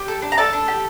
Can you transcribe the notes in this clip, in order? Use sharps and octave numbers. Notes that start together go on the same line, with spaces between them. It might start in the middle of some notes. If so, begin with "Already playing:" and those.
Already playing: G4 G5
A4
D4
A#5
D4 A4 A5
D4
G4